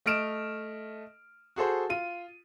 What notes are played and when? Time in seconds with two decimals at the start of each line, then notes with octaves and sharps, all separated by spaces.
0.06 A3 D#5 F6 D7 E7
1.56 F#4 G#4 A4 C5
1.90 F4 D#7